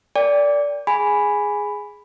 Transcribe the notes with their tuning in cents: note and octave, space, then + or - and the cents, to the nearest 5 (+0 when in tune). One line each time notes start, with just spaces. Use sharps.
A#4 -10 D5 -15 G5 +30
G#4 +0 G#5 +0 B5 +5